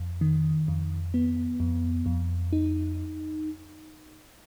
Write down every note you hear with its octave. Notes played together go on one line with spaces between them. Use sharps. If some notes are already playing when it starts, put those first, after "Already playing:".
Already playing: F2
D#3
F2
B3
F2
F2
D#4